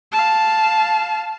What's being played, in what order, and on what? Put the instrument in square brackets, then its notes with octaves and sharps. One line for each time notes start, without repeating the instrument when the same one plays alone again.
[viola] F5 A5